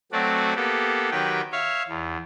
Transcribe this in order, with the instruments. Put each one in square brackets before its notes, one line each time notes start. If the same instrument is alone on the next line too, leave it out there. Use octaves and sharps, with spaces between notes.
[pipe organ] F#3 A3 C4 F#4 D5
A#3 B3 G4 A4
D#3 F#3 G4 B4 G5
C#5 E5 F5
E2